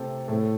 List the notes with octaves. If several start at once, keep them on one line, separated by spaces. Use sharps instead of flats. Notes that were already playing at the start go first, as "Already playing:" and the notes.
Already playing: C3 A3 G4 A4 C5
A2 A3